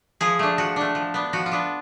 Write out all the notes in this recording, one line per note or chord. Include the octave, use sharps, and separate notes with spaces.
F3 G#4
A3 D4
F3 F#4
A3 D4
F3
B3 D4
F3 F#4
F4
B3 D4